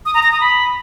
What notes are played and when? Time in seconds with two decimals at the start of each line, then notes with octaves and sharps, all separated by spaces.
0.06 D#6
0.14 A#5
0.23 A#6
0.32 D#6
0.41 B5